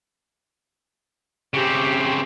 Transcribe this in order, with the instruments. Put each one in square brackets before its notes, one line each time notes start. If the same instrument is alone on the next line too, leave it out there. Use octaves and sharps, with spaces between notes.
[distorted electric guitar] C#3 C4 [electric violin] G4